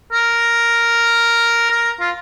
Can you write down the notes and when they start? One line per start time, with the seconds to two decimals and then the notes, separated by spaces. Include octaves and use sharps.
0.13 A#4
1.70 A#4
2.00 F4